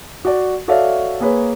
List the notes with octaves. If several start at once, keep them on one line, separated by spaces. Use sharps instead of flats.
F#4 D5
F#4 A4 C#5 D5 E5 F5
A#3 G#4 B4 C#5